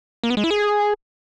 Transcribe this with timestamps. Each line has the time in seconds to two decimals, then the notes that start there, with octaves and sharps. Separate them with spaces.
0.24 A#3
0.30 B3
0.37 G#3
0.44 E4
0.51 G#4